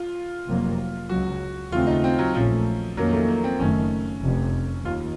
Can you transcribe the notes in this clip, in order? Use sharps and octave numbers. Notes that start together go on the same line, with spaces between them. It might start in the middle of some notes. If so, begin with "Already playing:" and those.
Already playing: F4
F1 F2 C3 F#3 A#3
C#2 C#3 F#3 F#4
D#2 C#3 A3 C4 F4
D#4
C4
F#3
A#1 A#2 F3 A3 C#4
F2 D#3 F#3 A#3 C#4
A3
A#3
C4
F#1 F#2 D#3 A3 C#4
F1 F2 C3
D#2 F4